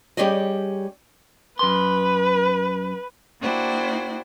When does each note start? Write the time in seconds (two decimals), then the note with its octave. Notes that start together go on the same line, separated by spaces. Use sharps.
0.17 G3 C#4 G4 G#4 D5 D#5
1.59 F#2 B4 C6
3.40 A#3 D4 E4 F#4 C5 G5